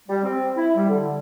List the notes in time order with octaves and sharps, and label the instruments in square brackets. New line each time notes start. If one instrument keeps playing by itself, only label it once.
[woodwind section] G3
C4
E4
G3
D3